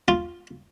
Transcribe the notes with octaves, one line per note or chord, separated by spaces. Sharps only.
F4